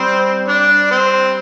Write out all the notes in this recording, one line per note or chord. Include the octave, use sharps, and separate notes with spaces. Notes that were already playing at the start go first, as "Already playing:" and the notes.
Already playing: G3 C4 C5
D4 D5
C4 C5